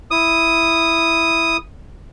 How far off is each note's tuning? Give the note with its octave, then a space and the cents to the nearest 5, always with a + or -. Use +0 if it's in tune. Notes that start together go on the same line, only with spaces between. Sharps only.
E4 +0 D#6 +0